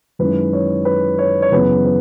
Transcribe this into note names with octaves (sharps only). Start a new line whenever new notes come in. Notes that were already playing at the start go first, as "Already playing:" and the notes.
F#2 D#3 G#3 C#4 E4 B4
C#5
B4
C#5
C#5
F#2 C#3 E3 B3 B4
B4